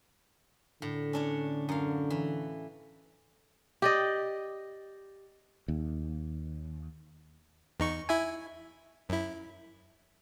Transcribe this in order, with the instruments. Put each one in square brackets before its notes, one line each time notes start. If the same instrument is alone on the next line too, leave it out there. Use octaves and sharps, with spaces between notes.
[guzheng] A2 [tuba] D3
[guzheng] C#4 D4 C#5
F#2 F5
E3
[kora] G4 D5 D#5
[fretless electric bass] D#2
[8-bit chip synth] E2 D#4 C#6
E4 E5 G#5
F#2 E4